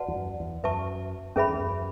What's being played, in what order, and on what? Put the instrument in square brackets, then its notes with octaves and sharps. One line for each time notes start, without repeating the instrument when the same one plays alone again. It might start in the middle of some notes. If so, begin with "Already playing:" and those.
Already playing: [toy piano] F#4 B4 D5 F#5 A5
[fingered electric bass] E2
F#2
E2
[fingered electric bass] F#2 [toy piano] B4 E5 A5 C#6
[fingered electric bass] F#2 [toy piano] C#4 G#4 B4 E5 B5
[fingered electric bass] E2
F#2